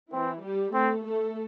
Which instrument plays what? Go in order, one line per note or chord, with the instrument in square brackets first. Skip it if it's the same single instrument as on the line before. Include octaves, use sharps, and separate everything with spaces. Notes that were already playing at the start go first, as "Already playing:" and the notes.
[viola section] E3 E4 [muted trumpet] C4
[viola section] G3 G4
[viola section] A3 A4 [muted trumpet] C4
[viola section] A3 A4